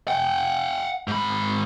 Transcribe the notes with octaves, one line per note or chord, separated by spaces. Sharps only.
F#5 G5
G#2 B5